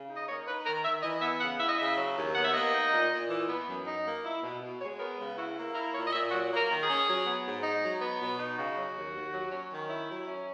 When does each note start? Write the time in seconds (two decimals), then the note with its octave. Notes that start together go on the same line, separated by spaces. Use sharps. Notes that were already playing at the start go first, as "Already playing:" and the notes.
Already playing: C#3
0.09 D#4
0.17 D#5
0.28 A#3 C#5
0.47 D#4 B4
0.66 D#3 A#4
0.84 D#3 E5
1.03 E3 D#5
1.22 B3 E5
1.41 C#3 F#5
1.60 E4 E5
1.69 D#5
1.78 C#3 E5
1.97 F#3
2.16 D#2
2.35 B3 F#5
2.45 E5
2.54 A#3 D#5
2.73 D#4
2.92 A#2
3.11 A#2
3.30 E3
3.48 B3
3.67 F#2
3.87 D#4
4.05 A#3
4.25 E4
4.43 B2
4.62 B2
4.81 G#3 C#5
4.99 B3 A#4
5.18 C#3
5.37 E4 F#4
5.57 A#3
5.75 E4 A#4
5.94 A#2 C#5
6.07 D#5
6.13 A#2 E5
6.31 F#3 F#4
6.51 A#3
6.56 A#4
6.69 D#3
6.83 G#4
6.88 C#4
7.07 F#3
7.25 B3
7.46 G#2
7.64 D#4
7.83 F#3
8.01 B3
8.20 B2
8.39 D#4
8.58 C#3 F#4
8.76 F#3
8.96 D#2
9.14 D#2
9.33 F#3
9.52 C#4
9.71 D#3
9.90 E4
10.09 F#3
10.28 C#4